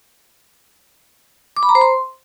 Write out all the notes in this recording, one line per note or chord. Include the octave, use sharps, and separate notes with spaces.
D6
B5
A#5
C5
C6